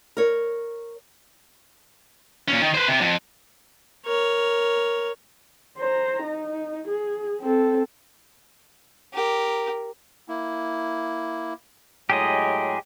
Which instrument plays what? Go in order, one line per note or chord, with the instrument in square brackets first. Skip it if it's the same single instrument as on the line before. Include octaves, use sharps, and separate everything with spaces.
[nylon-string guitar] A#4 C#5
[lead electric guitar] A#2 C#4
D#3
B4 C5
C3
F2
[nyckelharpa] A#4 C#5
[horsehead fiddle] C5 A#5
D#4
G#4
C4 A4
[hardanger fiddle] G4 A#4
[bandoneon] A#3 E4
[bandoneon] A2 F#3 G#3 [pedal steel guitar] G4 G#4 D#5